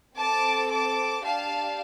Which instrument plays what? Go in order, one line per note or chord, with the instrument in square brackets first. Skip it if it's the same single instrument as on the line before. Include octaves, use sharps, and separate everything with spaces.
[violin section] C4 A4 A5 D6
A5 D6
D4 G4 F5 A5